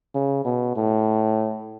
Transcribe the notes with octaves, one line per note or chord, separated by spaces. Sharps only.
C#3
B2
A2